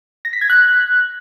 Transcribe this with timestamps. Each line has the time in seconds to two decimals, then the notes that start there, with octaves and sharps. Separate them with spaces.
0.25 A#6
0.33 B6
0.41 G#6
0.50 F#6